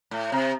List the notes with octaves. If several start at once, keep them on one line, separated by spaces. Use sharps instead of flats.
A2
C3